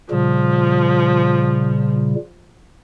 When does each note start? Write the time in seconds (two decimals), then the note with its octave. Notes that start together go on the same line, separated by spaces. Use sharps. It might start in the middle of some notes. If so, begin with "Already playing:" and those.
0.11 A#2 C#3 F3 G3